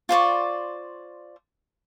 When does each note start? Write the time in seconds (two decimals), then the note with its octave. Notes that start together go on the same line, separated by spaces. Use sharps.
0.09 F4 C5 D5 C#6